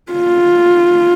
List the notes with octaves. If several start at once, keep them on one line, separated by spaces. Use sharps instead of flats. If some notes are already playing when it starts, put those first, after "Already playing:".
F4